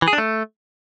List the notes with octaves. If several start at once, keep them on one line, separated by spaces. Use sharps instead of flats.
E3
G#4
D4
A3